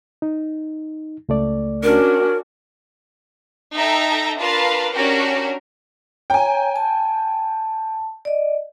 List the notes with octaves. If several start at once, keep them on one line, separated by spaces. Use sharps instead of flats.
D#4
C#2 A3 D5
C#4 D4 F#4 A#4
D#4 A4 E5 G5 A#5
D4 F4 A#4 B4 F5 A5
C#4 D4 F#4 G4 A#4
C#5 G5 G#5 A#5
A5
D5 D#5